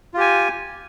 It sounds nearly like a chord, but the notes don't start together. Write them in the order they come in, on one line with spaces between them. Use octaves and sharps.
F4 G4 G#5